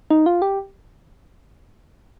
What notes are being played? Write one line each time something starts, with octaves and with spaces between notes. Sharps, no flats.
D#4
F4
G4